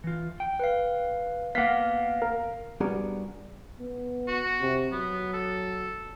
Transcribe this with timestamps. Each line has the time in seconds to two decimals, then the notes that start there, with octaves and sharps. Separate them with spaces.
0.04 E3 F4
0.40 G5
0.59 B4 F5
1.55 A#3 B3 F5 F#5 B6
2.22 A#4
2.80 G3 B3 D4 F#4 G#4 A#4
3.80 B3
4.27 F#4
4.61 C3
4.92 F#3 B3
5.33 A4